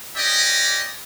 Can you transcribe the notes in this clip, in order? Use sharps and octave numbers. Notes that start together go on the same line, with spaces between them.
C#4 G4 D5 D#5